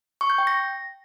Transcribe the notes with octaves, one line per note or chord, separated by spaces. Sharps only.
C#6
G6
G5
A#6